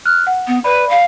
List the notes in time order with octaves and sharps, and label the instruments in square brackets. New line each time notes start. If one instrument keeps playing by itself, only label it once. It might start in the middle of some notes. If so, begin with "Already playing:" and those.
[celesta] F6 F#6
F#5
[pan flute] B3
[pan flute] B4 [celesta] D5 B5
[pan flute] F5